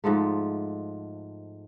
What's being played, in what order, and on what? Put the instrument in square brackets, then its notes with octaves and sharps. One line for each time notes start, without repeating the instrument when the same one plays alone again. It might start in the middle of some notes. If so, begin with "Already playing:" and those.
[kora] G#2 F3 G#3 A3